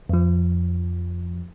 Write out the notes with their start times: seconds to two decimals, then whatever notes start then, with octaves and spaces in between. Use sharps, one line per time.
0.09 F2 F3